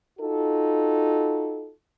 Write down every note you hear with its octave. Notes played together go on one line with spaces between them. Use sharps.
D#4 F4 F#4 A4